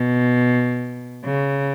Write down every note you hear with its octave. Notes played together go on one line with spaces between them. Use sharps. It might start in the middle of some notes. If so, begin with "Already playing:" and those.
Already playing: B2
C#3